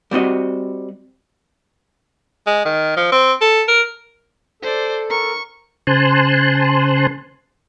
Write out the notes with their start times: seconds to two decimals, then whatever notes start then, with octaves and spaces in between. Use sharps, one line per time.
0.11 G3 C4 F#4 D#5
2.47 G#3
2.66 D#3
2.97 F3
3.12 C4
3.41 A4
3.68 A#4
4.63 A4 C5 D5
5.10 A#4 C#6
5.87 C#3 C5 G#5 A5 C6 F#6